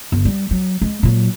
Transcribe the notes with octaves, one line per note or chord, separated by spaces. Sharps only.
G1
G3
F#3
G#3
A#2 F#3